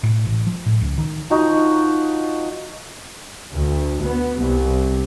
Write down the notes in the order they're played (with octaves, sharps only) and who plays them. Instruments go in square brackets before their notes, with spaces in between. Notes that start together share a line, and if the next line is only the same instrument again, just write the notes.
[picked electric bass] A2
A1
F3
A2
C#2
D#3
[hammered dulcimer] F3 D#4 F#4
[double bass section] D2
B3
C2